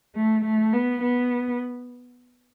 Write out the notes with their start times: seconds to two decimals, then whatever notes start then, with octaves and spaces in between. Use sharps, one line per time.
0.15 A3
0.45 A3
0.73 B3
1.01 B3